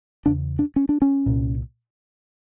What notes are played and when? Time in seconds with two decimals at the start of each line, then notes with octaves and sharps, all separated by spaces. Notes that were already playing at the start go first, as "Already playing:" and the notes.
0.26 E2 C#3 D4
0.59 D4
0.76 C#4
0.89 D4
1.02 C#4
1.26 C2 A#2